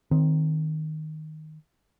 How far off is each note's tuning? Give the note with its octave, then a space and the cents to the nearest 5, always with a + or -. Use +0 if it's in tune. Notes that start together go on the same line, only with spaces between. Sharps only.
D#3 +0 C4 +0